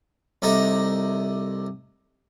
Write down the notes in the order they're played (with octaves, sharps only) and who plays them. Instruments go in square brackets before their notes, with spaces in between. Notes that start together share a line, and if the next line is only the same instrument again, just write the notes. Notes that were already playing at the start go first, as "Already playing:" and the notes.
[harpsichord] C2 C3 D#4 A4 A#5